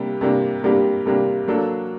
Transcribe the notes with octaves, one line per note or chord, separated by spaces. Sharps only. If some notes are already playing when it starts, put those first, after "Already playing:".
Already playing: C3 G3 A#3 D4 G4
C3 G3 A#3 D4 G4
C3 G3 A#3 D4 G4
C3 G3 A#3 D4 G4
F#3 A#3 D4 A4